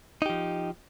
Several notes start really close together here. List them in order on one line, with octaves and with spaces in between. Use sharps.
D#4 G4 F3